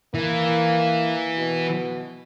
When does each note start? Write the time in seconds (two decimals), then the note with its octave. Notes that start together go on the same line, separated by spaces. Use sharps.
0.15 E3 A#3
1.38 B2